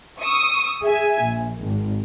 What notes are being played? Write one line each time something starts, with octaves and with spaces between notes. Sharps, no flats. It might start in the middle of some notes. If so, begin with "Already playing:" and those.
C#6 D#6 E6
G#4 E5 G#5
A#1
G#1